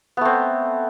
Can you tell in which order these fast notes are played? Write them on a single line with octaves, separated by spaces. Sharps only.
B3 A3 C4